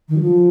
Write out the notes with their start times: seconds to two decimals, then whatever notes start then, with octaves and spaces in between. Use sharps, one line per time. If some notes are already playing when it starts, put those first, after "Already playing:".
0.09 D#3
0.16 F#3
0.21 F3